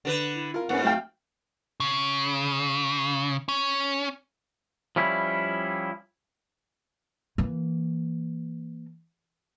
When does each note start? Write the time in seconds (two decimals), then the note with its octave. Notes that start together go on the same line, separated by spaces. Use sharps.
0.05 D3 A#4 B4
0.36 E4
0.54 F4 A#4
0.69 G#2 A#3 B3 C#4 F#5
0.83 F#3 A3 F5 G5
1.80 C#3
3.48 C#4
4.96 F3 G3 C#4 E4
7.38 E3 A#3